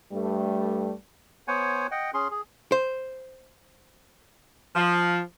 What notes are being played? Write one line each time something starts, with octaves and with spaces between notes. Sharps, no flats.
G2 G3 A3
B3 C5 C#5 F#5 G#5
D#5 F#5 G5
C#4 G#4 C6
G#4
C5
F3